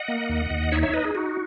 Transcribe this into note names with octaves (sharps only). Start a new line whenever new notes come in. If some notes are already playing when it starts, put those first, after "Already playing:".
Already playing: D#5 F#5
A#3
D#2
D#2
D#4 C#5 E5
C#5 E5
D#4 B4 D#5
G#4
D#4 F#4